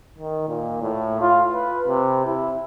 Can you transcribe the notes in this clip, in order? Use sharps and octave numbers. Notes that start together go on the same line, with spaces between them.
D#3
A#2
A2
F4
B4
C3
E4